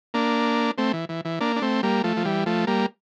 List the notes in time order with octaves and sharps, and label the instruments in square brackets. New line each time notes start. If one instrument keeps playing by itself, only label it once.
[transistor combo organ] A#3 D4
A3 C4
E3
E3
E3
A#3 D4
D4
A3 C4
G3 A#3
F3 A3
F3
E3 G3
F3 A3
G3 A#3